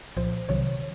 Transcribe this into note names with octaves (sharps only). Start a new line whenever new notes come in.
C2 A#2 F3 C5
C2 C3 D#3 F#3 C#5